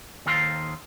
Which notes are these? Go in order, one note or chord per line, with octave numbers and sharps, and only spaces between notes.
D#2 D#3 A4 C5 F5 C6